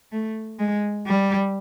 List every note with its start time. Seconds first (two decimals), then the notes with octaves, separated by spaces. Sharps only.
0.12 A3
0.59 G#3
1.06 G3